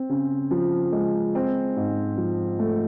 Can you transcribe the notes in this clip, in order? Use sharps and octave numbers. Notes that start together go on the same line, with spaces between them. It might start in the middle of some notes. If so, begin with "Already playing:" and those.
Already playing: C4
C#3
F3
G#3
C4
G#2
F3
A3